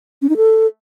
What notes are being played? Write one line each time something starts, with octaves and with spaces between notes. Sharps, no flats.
C#4
D#4
A4